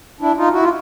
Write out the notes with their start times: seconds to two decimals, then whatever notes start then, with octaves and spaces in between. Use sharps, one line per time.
0.21 D4 E4
0.37 D#4 F4
0.53 E4 F#4
0.63 F4